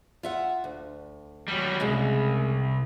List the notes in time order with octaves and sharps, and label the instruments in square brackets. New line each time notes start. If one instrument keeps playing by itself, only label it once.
[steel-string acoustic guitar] F4 E5 F#5
D2
[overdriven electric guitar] F#3 G3
[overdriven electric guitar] C2 [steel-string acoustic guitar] C#3 G#3